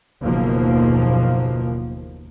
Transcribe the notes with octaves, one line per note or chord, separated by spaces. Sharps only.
F#1 D#2 B2 F3 A#3